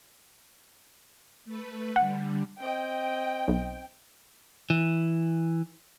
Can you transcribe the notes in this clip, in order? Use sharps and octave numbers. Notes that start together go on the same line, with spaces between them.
A3 B4
D3 G3 F#5
C4 D#5 G5
B1
E3